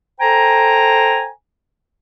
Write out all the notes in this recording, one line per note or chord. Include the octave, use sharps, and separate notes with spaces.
A4 C5 G5 G#5 A#5